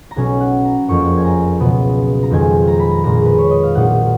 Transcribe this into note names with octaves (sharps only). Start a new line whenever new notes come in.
A#5
B1 B2 F#3 C#4 G#5
F#5
A#5
F#1 F2 F3 A#3 C#6
G#5
A#5
C#2 B2 F#3 B3
A#5
F2 D#3 G#3 G#5
A#5
B5
A#5
A#1 A#2 G#3 A#5
B4
C#5
D#5
F5
A#1 A#2 F#3 A#3 D#4 F#5